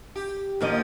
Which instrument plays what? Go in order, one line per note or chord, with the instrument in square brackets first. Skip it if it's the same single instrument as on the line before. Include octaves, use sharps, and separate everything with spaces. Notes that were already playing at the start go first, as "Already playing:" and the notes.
[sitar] G4
[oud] D#2 A#3 D#5 [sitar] D3 F3